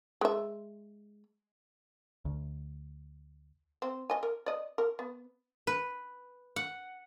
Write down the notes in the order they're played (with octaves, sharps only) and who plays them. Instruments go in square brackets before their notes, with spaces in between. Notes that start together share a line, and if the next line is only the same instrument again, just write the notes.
[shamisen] G#3 E5
[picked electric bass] D2
[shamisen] C4
D#5 G#5
A#4
D5 D#5
A#4
B3
[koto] B4
F#5